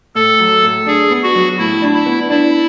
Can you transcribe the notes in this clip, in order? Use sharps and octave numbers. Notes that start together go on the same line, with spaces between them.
A2 A4
F#3
A2
D4 G#4
B3
F#4
F#3
A2 E4
D4
E4
B3
D4 E4